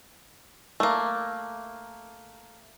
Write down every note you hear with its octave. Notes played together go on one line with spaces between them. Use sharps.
A3 A#3